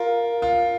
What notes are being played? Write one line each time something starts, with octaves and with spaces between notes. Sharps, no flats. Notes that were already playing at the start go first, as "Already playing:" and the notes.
Already playing: F4 A#4
F4